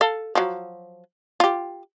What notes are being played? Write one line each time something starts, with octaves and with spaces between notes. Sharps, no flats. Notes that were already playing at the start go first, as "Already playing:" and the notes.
A4 F5
F3 F#3
F4 G4